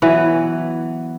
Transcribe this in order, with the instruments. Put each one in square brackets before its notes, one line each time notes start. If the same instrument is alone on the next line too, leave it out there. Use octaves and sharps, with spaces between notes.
[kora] E3 F#3 B3